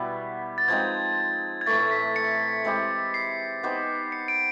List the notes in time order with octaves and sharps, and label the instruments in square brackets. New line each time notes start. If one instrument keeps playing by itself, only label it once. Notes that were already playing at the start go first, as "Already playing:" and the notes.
Already playing: [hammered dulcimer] B2 G3 B3 E4
[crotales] A6
[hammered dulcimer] F3 G#3 C4 D#4 [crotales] G#6
[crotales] G#6
[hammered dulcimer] A2 E3 A3 [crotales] A6
[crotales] B6
C#7
[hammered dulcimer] G#3 C4 E4 G4
[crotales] C7
[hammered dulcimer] B3 D#4 G4 C5
[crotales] C#7
D7